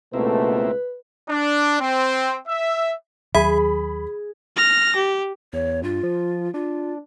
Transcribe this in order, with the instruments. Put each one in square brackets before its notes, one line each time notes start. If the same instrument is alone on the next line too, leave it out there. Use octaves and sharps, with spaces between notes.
[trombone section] C#2 B2 A3 [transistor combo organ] A#3 C4 E4 [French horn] B4
[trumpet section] D4
C4
E5
[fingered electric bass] D#2 F#3 [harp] G#4 [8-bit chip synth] E5 [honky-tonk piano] B5
[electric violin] F6 A#6
G4
[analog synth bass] E2 [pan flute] C#5
[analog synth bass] G2 [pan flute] F4
[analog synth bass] F3
[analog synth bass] D4 [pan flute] F4